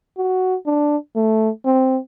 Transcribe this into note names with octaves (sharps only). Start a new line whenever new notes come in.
F#4
D4
A3
C4